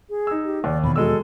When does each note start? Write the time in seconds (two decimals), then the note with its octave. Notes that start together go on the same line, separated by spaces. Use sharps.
0.10 G#4
0.27 D#4 E6
0.45 G4
0.64 D#2 D5
0.84 E2 B2 D#3 B5
0.96 F#3 G#3 A4 E6